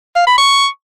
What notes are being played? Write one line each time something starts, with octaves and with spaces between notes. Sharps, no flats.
F5
B5
C#6